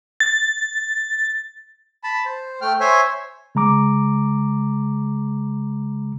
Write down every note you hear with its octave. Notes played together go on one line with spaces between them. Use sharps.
A6
A5 B5
C5
A3 G5 F6
C5 C#5 E5 G#5 C6
C#3 G#3 A#5 D6